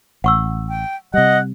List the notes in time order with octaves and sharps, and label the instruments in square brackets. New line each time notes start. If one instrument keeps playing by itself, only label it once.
[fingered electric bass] A1 [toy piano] F#5 C#6 E6
[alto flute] G5
[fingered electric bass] C3 G3 [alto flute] D#5 [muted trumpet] F#5